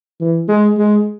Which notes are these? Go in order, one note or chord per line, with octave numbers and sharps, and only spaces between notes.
E3
G#3
G#3